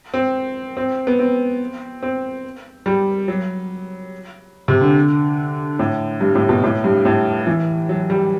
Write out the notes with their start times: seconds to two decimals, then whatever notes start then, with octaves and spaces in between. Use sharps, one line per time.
0.14 C4
0.77 C4
1.07 B3
1.19 C4
2.03 C4
2.86 G3
3.28 F#3
4.68 C3
4.81 D3
5.79 A2
6.21 G2
6.35 A2
6.49 B2
6.64 A2
6.84 G2
7.05 A2
7.47 E3
7.89 F#3
8.10 G3